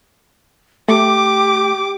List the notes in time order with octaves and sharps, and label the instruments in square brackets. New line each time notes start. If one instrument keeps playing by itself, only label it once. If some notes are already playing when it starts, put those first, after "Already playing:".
[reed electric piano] A3 [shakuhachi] G4 [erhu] D6